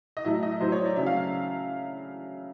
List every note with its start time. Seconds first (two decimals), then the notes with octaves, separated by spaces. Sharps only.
0.17 D#5
0.24 A2 F#3 A3 E5
0.43 D#5
0.60 A2 F#3 A3 C5
0.72 C#5
0.85 D5
0.96 C#3 F#3 A3 E5
1.06 F5